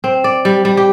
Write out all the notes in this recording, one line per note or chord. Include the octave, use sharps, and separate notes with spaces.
C4
D5
G3
G3
G4